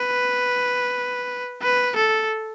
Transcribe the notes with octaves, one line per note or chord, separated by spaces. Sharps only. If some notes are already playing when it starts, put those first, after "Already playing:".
Already playing: B4
B4
A4